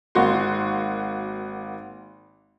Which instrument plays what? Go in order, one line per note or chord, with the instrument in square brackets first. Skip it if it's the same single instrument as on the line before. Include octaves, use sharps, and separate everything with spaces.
[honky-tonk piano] G#1 A#3 F#4 C6